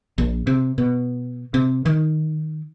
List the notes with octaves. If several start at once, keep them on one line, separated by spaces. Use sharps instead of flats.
A#1
C3
B2
C3
D#3